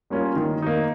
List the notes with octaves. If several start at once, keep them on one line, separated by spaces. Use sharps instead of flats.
G3 A#3 C#4 F4
D#3
A#3 D#4